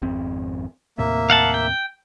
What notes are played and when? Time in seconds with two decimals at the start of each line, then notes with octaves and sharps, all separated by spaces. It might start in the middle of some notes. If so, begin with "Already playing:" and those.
0.02 G#1 F2 C4
0.98 D#2 A2 C3 A#3 E5
1.30 F5 F#5 A5
1.54 G5